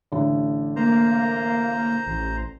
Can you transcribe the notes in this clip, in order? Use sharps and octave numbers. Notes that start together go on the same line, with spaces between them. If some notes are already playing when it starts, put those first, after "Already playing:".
A1 D3
A#3 C5 A#5
A1